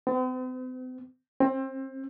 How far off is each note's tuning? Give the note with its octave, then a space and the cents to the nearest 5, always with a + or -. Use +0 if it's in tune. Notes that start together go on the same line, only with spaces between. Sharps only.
C4 -45
C4 +25